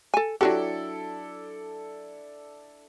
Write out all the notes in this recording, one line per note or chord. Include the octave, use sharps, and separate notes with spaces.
A4 G#5
F#3 D4 E4 F#4 G4 A4